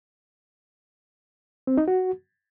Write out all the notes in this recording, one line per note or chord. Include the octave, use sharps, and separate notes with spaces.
C4
D#4
F#4